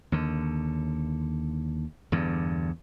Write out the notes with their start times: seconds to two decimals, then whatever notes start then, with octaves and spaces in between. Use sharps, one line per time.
0.12 D#2 D3
2.12 E2 G2 D3